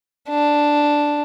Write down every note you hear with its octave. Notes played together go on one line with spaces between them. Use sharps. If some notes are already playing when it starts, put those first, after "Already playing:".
D4